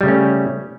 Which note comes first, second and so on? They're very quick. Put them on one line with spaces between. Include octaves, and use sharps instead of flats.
G3 C#3 A3 C#4